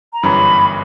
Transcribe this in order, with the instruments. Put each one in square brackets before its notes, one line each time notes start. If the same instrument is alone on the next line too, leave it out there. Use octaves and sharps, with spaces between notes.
[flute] A#5
[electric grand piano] G1 F#2 E3 G3 C#4 [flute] B5